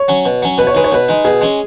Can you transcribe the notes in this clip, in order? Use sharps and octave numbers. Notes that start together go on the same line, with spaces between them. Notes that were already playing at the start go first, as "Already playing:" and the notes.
Already playing: C#5
F#3 C#4
B2
F#3 C#4
B2 B4
C#5
G#3 D#4 B4
C#5
B2 B4
G#3 D#4
B2 G#4
G#3 C#4